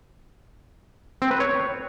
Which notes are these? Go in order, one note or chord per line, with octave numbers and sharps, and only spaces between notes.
C4
B4
C#5